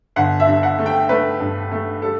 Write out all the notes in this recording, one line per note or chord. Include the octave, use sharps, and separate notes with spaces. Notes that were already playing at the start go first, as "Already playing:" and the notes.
G1 F#5
E5
G2
F#5
A3
G5
A3 B4
G2
A3
G3 A4